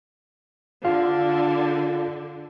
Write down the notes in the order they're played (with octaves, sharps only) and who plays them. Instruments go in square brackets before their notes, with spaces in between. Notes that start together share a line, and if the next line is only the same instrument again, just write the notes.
[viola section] D3 [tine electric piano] F4 F5